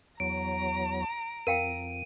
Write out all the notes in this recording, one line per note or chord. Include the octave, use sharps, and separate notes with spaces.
E2 F#3 A#5 D7
F2 A#4 F5 G5 D#7